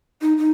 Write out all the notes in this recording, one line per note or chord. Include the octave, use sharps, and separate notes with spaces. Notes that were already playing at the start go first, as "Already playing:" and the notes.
D#4
D#4